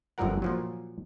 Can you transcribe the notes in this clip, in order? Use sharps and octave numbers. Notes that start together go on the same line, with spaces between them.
G1 F#2 D3 F3 A#4 F#5
A#2 F3 F#3